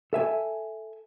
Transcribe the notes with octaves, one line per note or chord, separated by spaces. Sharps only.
A4 E5 G#5